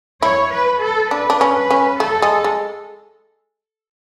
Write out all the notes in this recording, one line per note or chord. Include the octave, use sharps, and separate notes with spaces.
E4 C#5
B4
A4
D4 B4
D4
C#4
B4
C#4
A3 A4
G#3
G#3